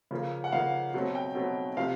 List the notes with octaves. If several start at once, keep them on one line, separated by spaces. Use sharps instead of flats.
C#3 F3 A#3
F#5
C#3 F3 A#3 F5
B2 F#3 A3 C4
G5
B2 F#3 A3 C4
C3 F3 A3 C4 F5